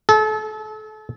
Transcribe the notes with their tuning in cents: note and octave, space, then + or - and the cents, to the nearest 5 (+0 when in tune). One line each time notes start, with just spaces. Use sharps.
A4 -35